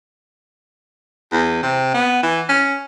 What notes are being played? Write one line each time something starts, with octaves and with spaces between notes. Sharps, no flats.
E2
C3
B3
E3
C#4